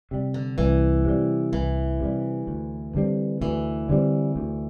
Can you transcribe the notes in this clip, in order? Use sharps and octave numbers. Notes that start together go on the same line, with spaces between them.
C3 G3
D3
C2 E3
C3 G3
C2 E3
C3 G3
D2
D3 G3 C4
D2 E3
D3 G3 C4
D2